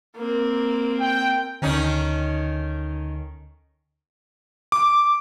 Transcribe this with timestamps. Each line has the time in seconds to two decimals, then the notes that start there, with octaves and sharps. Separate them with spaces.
0.17 A#3 C4
1.01 G5
1.62 D2 D3 D#3 C#4 D#4
4.72 D6